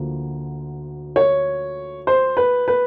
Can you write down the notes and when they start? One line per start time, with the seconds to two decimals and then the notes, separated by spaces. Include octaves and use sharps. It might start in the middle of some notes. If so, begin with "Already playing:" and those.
Already playing: D2 D3 F3 A#3
1.16 C#5
2.07 C5
2.37 B4
2.68 B4